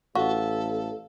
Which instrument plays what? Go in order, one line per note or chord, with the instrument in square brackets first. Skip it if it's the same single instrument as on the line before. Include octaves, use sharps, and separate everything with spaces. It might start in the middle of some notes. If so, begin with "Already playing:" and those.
[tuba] A1 [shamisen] F#4 [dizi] A4 [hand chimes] F5